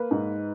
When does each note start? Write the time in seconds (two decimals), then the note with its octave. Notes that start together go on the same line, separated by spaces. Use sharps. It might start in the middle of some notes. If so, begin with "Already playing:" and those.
Already playing: A#3 B4
0.11 G#2